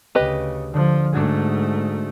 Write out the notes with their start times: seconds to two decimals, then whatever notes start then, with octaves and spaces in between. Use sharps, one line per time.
0.15 D2 C#3 G4 B4 D#5 D#7
0.74 D3 F3
1.12 G#2 A3 D4 F#4 G#4